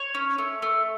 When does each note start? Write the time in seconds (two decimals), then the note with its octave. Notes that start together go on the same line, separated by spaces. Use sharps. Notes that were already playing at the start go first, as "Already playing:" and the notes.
Already playing: C#5
0.15 C#4
0.38 A3
0.62 A3